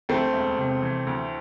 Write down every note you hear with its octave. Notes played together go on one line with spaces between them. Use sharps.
D2 A3 C4
E1
C3
E3
D2